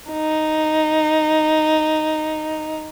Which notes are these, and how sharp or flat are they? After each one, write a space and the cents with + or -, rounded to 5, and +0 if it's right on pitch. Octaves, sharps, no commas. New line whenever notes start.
D#4 -5